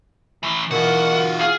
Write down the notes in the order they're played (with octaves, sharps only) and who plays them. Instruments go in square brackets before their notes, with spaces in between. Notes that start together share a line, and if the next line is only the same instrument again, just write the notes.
[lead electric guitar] A2 E3
[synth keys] B2 E3 [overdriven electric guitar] F4 F#4 [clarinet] A#4 [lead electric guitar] F#5
[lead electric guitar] G#4 [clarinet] F5